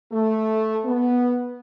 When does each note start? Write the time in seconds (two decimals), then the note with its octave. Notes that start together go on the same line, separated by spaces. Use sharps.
0.12 A3
0.85 B3